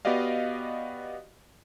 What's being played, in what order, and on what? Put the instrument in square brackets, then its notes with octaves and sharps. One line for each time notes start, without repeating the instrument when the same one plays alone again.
[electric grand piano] B3 F#4 G4 D5 D#5 F5